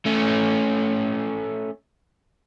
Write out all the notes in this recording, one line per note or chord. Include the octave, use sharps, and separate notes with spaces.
A3 C#4